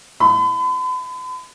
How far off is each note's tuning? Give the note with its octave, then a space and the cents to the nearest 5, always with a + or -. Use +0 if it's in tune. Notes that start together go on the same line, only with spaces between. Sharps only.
E4 +0 B5 +40